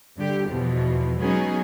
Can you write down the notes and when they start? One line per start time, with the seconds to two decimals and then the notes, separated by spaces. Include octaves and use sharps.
0.17 G2 D3 G4
0.48 E2 B2 E3 F3
1.19 F#3 G#3 B3 C#4 D#4 G#4